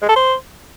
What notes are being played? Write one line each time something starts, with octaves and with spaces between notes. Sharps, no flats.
G#3
A4
C5